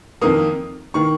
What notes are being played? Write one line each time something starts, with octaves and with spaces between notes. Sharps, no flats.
F2 D#3 A#3 D#6
D#3 A#3 C#6